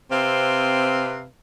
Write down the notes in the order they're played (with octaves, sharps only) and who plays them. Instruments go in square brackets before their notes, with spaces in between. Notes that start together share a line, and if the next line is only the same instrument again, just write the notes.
[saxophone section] C3 C4 B4 F5